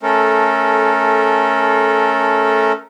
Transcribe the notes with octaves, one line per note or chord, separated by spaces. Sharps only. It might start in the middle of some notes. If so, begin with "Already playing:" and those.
A3 C#4 A4 A#4